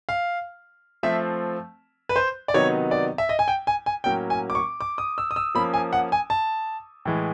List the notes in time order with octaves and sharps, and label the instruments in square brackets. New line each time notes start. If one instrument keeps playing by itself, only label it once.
[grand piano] F5
F3 A3 C4 E5
B4
C5
D5
C3 D#3 F#3 B3 D#4 C#5
D5
E5
D#5
G#5
G5
G#5
G#5
A2 F#3 A#3 C#4 G5
G#5
D6
C#6
D6
D#6
E6
D#6
E6
F3 A#3 C#4 B5
G#5
F#5
G#5
A5
A2 E3 G#3